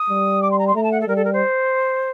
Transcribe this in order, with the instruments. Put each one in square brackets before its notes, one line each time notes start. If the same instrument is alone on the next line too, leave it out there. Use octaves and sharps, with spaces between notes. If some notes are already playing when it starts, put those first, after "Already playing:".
Already playing: [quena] D#6
[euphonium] G3
[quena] D6
C6
A#5
C6
[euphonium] A3 [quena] A#5
[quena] A5
F#5
A4
[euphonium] G3 [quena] A#4
[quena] A4
A#4
C5